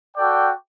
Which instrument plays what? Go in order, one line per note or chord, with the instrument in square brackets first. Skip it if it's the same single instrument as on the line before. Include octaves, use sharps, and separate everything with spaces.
[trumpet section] F#4 A4 D5 G5